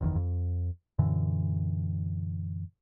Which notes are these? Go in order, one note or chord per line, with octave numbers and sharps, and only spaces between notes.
F#1 E2 B2 D#3
F2
F#2 A#2 D3 E3